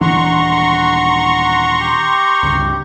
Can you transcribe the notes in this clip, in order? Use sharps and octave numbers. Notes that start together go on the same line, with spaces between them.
D#1 E3 D4 F#5 A#5 C6 C#6
G4
C#2 G2